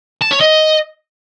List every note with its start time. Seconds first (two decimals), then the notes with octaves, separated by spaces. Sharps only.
0.21 A5
0.31 C#5
0.40 D#5